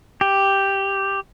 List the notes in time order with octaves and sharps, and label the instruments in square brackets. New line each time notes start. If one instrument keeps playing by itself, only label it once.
[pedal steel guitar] G4